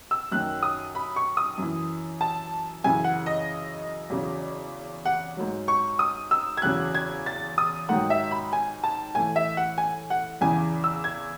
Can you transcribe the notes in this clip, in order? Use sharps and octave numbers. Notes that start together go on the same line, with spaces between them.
E6
F#2 D#3 F#3 F#6
D#6
B5
C#6
D#6
F#2 E3
A5
F#2 C#3 E3 G#5
F#5
D#5
E2 C#3 F#3
F#5
G#2 F#3
C#6
D#6
E6
G#6
E2 C#3 F#3 F#6
G#6
A6
D#6
G#2 D#3 F#3 F#5
E5
B5
G#5
A5
A2 E3 G#5
E5
F#5
G#5
F#5
E2 C#3 E3 G#5
E6
G#6